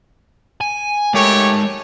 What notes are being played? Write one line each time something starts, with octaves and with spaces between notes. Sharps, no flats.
G#5
G#3 A3 G4 A#4 C#5